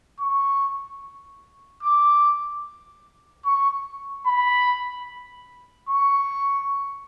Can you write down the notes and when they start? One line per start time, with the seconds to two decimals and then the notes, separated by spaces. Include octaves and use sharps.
0.20 C#6
1.83 D6
3.45 C#6
4.26 B5
5.89 C#6